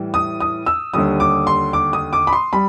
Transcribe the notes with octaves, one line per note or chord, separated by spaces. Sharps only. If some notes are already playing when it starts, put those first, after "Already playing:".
Already playing: A2 E3 G3
D#6
D#6
E6
D#2 D3 G3 D#6
D6
C6
D6
D#6
D6
B5
C6
G3 B5